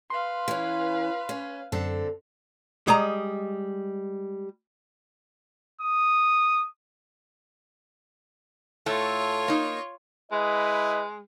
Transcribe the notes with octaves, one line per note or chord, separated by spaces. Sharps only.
B4 F5 C6
E3 C#4
C#4
F#2 D3 C4 A4
G3 G#3 D#5 A#5
D#6
A2 A3 F4 A4 C#5
A#3 D#4
G#3 E4 B4 D#5